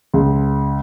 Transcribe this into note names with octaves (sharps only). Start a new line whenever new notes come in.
C#2